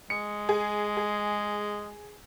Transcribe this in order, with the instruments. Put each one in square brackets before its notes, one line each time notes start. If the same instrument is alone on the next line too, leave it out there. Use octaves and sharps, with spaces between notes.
[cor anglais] G#3 [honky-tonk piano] C#7
[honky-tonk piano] G#4
G#4